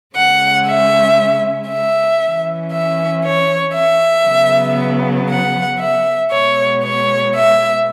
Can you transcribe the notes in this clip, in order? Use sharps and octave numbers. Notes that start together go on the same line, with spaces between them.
C#3 G#3 C#4 F#5
E5
E5
E3 C#4
E5
C#5
E5
C#3 F#3 B3
F#5
E5
B2 G#3 B3 C#5
C#5
E5